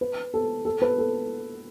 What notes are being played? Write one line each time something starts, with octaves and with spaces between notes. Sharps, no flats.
B4
A4
A4
B4
A4